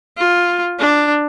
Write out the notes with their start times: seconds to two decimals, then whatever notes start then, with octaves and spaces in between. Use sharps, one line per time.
0.18 F4
0.79 D4